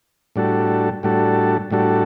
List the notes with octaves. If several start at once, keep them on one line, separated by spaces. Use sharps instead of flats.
A2 G3 D4 F#4 A4
A2 G3 D4 F#4 A4
A2 G3 D4 F#4 A4